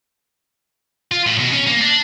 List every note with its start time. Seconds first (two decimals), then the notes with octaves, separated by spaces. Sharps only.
1.12 F4
1.26 A2
1.40 B2
1.52 C#4
1.67 A#3
1.81 D4